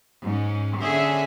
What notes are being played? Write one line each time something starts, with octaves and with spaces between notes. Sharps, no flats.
G#2 C#4
D3 C#4 G#4 E5